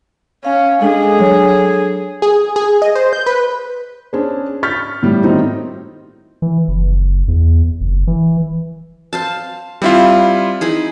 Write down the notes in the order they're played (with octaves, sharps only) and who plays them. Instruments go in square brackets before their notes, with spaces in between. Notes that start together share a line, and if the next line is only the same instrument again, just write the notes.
[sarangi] C#4 [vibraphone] F5
[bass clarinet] G#3 [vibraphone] D4 A4 [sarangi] G#4
[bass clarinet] F#3
[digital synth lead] G#4
G#4
D#5
C5
G6
B4
[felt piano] C#4 D4 G#4 C5
C#6 F6 G6 A6 B6
A2 G3
A2 D#3 C4 D#4 F#4
[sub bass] E3
F#1
E2
F#1
E3
[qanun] C5 F5 A5
[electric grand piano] G3 E4 F4 [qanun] C4 C5
[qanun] D#4 E4 G#4